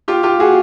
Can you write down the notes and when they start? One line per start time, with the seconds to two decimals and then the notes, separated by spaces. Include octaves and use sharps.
0.08 F4 G4
0.23 F4 G4
0.40 F#4 G#4